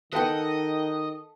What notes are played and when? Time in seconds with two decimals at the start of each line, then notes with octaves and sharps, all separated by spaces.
0.13 D#3 A4 B4 D#5 F#5 G5